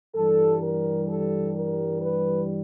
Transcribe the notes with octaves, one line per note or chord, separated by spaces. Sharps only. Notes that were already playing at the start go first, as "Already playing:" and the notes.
G2 E3 G3 A4
A#4
A4
A#4
B4